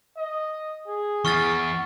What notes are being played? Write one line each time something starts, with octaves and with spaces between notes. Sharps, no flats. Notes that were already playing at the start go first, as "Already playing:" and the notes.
D#5
G#4
E2 C#6 F6 A6